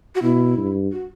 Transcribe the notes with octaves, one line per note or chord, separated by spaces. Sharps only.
F#4
B2 E4
G2
F#4